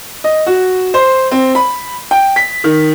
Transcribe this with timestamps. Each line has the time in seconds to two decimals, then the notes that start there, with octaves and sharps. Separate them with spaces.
0.24 D#5
0.47 F#4
0.94 C5
1.31 C4
1.55 B5
2.11 G5
2.36 B6
2.64 D#3